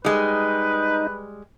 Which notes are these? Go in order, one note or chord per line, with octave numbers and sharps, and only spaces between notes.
G3 G#3 D#4 B4